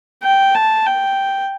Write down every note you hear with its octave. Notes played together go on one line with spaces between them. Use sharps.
G5
A5
G5